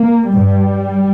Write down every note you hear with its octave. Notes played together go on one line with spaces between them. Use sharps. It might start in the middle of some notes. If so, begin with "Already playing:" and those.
Already playing: A#3
G2 G3